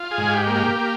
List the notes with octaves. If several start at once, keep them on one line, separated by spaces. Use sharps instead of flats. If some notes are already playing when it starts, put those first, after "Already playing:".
Already playing: F4
G#4
G#2
G4
A#3
G4
A#3